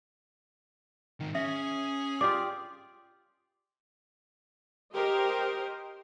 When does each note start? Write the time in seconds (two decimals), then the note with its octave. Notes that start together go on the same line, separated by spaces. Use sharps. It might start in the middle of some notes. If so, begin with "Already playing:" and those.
1.20 G#2 D#3
1.35 C#4 G#4 E5
2.21 F4 G4 D5 D6
4.93 G4 A#4 C5 D#5